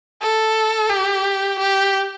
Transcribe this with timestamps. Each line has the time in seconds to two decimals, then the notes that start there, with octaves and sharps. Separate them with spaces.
0.22 A4
0.90 G4
1.59 G4